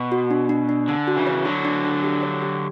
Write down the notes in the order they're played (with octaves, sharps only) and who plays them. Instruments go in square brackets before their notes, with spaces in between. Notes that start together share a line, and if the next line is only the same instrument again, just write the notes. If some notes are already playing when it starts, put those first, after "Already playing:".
Already playing: [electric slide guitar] B2
[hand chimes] F#4
D4
D4
D4
[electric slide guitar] D3 [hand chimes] D4
[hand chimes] F#4
[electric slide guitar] C#3 E3
[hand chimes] C#5
[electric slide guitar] D3 F#3 [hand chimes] D4
[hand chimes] D4
D4
G4
C#5
G4